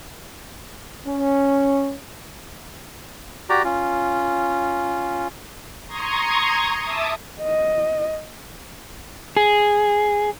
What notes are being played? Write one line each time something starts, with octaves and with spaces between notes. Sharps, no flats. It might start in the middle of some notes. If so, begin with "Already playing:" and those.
C#4
F#4 G4 D5 A#5
C#4 F4
A#5 C6 C#6 D#6 G#6
E5 A5 D6 D#6
D#5
G#4